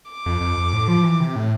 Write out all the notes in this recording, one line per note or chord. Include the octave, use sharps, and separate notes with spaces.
D6
F2
F2
F2
A2
F3
E3
C3
A2